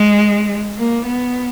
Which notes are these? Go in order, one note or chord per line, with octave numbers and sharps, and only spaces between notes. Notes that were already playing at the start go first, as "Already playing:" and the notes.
Already playing: G#3
A#3
B3